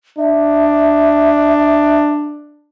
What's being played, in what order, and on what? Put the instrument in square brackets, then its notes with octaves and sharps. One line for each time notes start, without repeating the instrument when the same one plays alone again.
[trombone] D4 [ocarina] E5